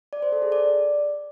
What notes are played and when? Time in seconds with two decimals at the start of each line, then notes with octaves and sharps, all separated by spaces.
0.13 D5
0.22 C5
0.32 A4
0.42 G#4
0.52 D5